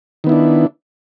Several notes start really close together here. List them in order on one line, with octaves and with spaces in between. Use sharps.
D#3 B3 E4 D4